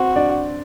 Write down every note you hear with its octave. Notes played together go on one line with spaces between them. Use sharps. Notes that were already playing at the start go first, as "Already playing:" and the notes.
Already playing: C4 F#4 C5
D4 D5